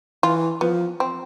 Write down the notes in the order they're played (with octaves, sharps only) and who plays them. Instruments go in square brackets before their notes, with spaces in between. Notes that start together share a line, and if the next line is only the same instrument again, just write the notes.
[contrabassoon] E3 [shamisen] F4
[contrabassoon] F3 [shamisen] B3
[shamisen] C4